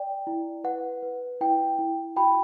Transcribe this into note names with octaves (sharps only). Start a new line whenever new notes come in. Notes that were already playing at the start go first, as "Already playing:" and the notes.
Already playing: D5 G5
E4
B4 F#5
B4
E4 G5
E4
F#4 G5 B5